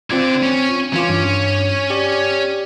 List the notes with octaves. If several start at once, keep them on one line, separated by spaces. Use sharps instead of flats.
D3 C4 F4 D5 G#6
C#4
E3 C#4 F4 D6
G2
G4 D5